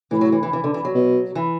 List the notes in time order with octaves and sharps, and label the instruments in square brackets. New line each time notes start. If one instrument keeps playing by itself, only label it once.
[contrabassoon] A2 [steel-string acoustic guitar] E3
[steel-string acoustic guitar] F#3
E3
E3
E3
D3
E3
F#3
[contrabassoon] B2
[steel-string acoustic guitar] E3